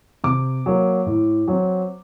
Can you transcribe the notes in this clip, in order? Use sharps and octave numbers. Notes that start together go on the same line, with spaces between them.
C3 D6
F#3 A#3
A2
F#3 C4